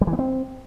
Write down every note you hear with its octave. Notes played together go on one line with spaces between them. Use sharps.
G3
E3
B3
C4